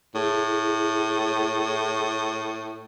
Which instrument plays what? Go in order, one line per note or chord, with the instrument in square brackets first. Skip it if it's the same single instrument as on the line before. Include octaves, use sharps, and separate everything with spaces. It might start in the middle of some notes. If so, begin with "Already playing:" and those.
[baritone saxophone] A2 [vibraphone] E4 G#4